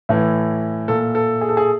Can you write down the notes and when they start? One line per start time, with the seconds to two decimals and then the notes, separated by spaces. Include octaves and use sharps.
0.09 A2 E3
0.88 A#2 A4
1.15 A4
1.41 G#4
1.49 A4
1.57 G#4